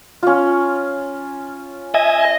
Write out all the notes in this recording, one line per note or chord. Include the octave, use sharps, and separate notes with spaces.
C#4 F4
D#5 E5 G#5